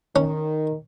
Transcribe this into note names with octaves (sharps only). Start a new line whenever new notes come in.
D#3 C#4